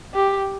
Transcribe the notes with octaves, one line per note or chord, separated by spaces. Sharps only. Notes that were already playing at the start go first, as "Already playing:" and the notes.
G4